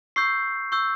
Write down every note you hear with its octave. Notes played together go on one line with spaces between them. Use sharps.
C#6 E6 G6 C7
C#6 E6 G6